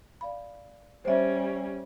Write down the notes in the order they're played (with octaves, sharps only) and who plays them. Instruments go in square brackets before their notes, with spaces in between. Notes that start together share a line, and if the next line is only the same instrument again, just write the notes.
[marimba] D5 F5 B5
[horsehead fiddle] G3 C#4 [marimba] C5 C#5 E5